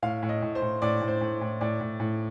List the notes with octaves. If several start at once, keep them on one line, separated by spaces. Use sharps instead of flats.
A2 F5
A2
D#5
A2
C5
A2
A2 D5
A2
C5
A2
A2
A2 D5
A2
A2